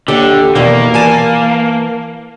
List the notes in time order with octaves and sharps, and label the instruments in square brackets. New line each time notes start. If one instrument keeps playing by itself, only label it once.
[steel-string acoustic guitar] D#2 G4 [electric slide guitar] D3
[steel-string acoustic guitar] E2 B2 D#3 [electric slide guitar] A#3
[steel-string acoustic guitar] E3 G#5 A5